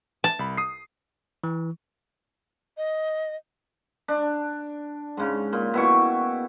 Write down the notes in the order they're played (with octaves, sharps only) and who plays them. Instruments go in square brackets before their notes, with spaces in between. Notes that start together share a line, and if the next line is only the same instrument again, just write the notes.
[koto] A5
[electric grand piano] C2 B5
D#6 C7
[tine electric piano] E3
[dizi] D#5
[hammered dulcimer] D4
G#2 C#3
A#2
B2 E4 G5 C#6